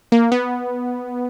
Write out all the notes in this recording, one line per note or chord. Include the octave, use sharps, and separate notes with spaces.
A#3
B3